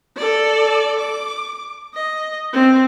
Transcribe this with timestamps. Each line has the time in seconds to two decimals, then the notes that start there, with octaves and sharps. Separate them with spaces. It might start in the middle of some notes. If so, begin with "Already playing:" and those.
0.17 A4 D5
1.00 D6
1.94 D#5
2.53 C4